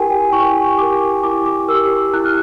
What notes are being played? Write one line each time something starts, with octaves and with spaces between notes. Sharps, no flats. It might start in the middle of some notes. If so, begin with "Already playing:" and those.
Already playing: E4 G4 A#4 G5 G#5
G5
E4 C#6
G4 A#4 D6
E4 D6
D6
G4 A#4 E6
E4 F#6
F6